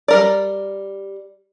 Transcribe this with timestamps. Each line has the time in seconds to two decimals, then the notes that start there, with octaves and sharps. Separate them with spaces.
0.08 G3 A#4 D5